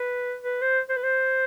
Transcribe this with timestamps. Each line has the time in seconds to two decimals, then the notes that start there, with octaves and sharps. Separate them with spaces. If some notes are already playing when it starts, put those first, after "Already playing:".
Already playing: B4
0.42 B4
0.62 C5
0.89 C5
0.97 B4
1.03 C5